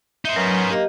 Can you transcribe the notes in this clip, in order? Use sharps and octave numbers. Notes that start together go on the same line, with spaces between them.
D#4 C5 E5
F#3 B3 C#4 A#4
A#3 G4 D#5